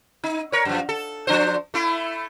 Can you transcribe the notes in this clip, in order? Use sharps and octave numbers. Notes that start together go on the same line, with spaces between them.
D#4
A#4 C#5
F#2 F3
A4
F3 D4 C5
A3 E4